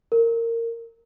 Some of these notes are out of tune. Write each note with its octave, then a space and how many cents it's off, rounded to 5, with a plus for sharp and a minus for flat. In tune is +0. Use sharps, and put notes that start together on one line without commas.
A#4 -20